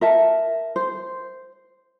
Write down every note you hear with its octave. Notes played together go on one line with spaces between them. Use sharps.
A#4 E5 A5
C5